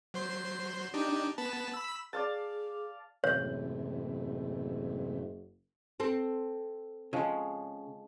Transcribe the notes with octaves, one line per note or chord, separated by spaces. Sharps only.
F#3 C5 C6
D4 D#4 G4
B3 B4 A5
B5 E6
G#4 D5 F5 A5
F#1 A2 C3 E3 C#5
C4 A4
C#3 F3 G#3 C#4